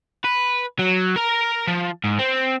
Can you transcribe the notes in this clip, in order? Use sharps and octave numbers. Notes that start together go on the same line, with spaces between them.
B4
F#3
A#4 A#5
F3
G#2
C4